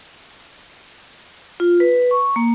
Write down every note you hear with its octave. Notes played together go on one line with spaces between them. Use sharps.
F4
B4
C#6
A#3